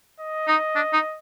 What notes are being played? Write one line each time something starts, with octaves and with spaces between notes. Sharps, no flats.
D#5
D#4
D4
D#4